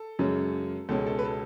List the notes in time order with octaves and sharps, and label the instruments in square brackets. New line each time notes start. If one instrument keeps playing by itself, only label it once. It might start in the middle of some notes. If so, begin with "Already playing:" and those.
Already playing: [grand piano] A4
F#2 C#3 G#3 C#4
C#2 B2 G#3 C#4 A4
A4
B4
A4